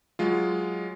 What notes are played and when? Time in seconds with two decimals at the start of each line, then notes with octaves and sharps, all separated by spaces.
0.19 F#3 G#3 F4